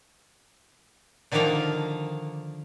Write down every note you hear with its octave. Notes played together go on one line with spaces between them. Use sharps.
D3 D#3 F3 A#3 F5 A#5